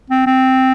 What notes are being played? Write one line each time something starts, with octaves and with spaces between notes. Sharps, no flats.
C4
C4